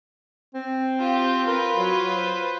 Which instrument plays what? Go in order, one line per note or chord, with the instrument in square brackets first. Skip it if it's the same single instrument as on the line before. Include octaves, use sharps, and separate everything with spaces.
[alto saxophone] C4
[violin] F4 G4
[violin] F4 B4 [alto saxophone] A#4
[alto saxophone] F#3
C5